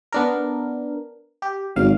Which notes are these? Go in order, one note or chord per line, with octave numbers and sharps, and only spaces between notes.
B3 D4 A#4
G4
G#1 F#3 F5